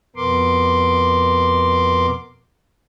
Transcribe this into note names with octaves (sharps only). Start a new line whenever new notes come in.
F2 B2 B3 A#4 C6 D6